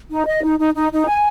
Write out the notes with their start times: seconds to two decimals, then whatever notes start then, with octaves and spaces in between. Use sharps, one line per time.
0.10 D#4
0.26 D#5
0.43 D#4
0.59 D#4
0.75 D#4
0.91 D#4
1.08 G#5